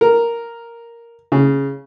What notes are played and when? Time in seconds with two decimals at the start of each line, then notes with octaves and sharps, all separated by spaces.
0.01 A#4
1.32 C#3